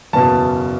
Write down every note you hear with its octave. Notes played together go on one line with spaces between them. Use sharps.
F#1 E2 B2 A5